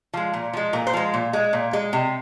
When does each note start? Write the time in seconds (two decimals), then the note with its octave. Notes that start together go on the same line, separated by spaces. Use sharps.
0.13 F3 G#3
0.33 A#2
0.53 F3 G#3
0.73 A#2 A#4
0.87 C5
0.93 F3 G#3
1.14 A#2
1.33 G#3
1.53 A#2
1.73 G#3
1.93 C3